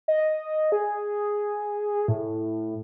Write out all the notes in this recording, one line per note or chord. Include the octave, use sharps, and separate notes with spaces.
D#5
G#4
A2